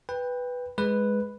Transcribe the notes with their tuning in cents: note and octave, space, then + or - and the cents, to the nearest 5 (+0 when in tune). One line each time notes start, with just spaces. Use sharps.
B4 +0 G5 +20
G#3 +0 B4 +0